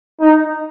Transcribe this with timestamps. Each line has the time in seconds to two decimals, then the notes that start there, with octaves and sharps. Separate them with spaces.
0.21 D#4